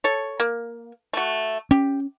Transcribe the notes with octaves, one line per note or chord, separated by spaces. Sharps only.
A4 C#5
A#3
A3 F#4
C#4 G4